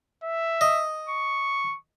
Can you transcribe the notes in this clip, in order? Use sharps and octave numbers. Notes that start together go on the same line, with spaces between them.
E5
D#5
C#6